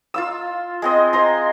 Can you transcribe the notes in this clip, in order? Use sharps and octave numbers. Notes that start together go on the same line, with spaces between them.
F4 F5 E6
G#3 C4 D#5
C5 A#5 C6